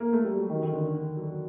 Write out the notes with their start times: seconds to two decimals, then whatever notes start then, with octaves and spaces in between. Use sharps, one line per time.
0.00 A#3
0.13 A3
0.25 G3
0.38 F#3
0.49 D#3
0.63 D#3
0.73 D3
1.17 F#3